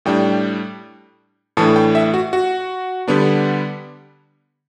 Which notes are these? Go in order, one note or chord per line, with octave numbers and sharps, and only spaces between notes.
A2 G3 D4 G5
A2 E3 A3 D4 A5
G5
E5
F#4
F#4
D3 G3 B3 D4